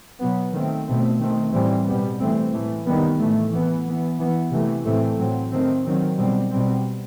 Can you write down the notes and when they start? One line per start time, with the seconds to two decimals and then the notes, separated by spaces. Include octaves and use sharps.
0.20 B2 F#3 B3
0.53 D#3 A3 C4
0.87 B2 A3 C4
1.19 D#3 A3 C4
1.53 A2 E3 G3 C4
1.86 B2 G3 B3
2.19 E3 A3 C4
2.53 A2 E3 A3
2.86 C3 D#3 G3 B3
3.19 A2 E3 A3
3.52 E3 B3
3.86 E3 B3
4.18 E3 B3
4.52 C3 E3 A3
4.85 A2 E3 A3 C4
5.18 A2 F#3 C4
5.51 D#3 A3 C4
5.85 D#3 F#3 C4
6.18 B2 G3 C4
6.51 B2 G3 C4